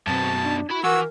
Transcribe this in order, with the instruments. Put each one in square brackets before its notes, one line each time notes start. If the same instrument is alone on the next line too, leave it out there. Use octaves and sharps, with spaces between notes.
[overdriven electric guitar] F#2 B2 [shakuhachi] C4 [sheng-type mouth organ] A5
[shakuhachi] D4
[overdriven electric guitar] E4 B5 [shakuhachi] F#4
[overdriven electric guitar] E3 [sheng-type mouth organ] F#4 E6 [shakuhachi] A#4